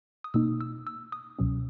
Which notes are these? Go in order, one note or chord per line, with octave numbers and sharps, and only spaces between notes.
D#6
B2 A#3 D#4 E6
E6
E6
D#6
C#2 B2 F#3 C#4